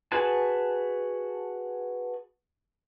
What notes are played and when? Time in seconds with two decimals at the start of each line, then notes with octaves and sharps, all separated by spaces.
0.12 F#4 G#4 B4 G#5 A5